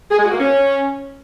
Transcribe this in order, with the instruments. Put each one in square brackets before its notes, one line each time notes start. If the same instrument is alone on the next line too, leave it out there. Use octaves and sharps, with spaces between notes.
[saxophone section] G#4
G#3
F#4
A#3
C#4